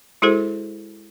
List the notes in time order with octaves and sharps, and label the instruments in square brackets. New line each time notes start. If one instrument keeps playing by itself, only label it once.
[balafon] G#3 E4 F#4 G#4 A4 C5